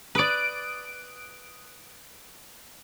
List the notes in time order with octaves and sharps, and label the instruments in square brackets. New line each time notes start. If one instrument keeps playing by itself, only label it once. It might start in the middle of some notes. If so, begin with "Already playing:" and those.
[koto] B4 D5 [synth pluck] D#6 F#6 D7